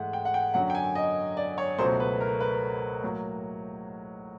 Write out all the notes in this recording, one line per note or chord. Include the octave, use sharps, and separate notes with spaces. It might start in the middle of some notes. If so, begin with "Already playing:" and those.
Already playing: G#2 E3 A3 F#5
G5
F#5
G5
F#2 D3 F#3 F#5
G5
G#5
D#5
D5
C#5
C#2 B2 F#3 A3 C5
B4
A#4
B4
A2 F#3 A#3